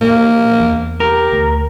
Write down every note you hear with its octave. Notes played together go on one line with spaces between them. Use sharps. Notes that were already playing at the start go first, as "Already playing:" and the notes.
A#2 A#3
E2
G4 A#4
D2